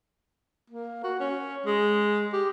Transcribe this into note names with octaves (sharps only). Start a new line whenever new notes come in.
A#3
F#4
C#4
G#3
G4